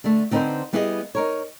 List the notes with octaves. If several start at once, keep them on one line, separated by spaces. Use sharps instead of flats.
D3 A3
D3 C4 D#4 A4 B4 C5
G3 B3 E4 G#4 C5 D#5
D#4 A#4 C#5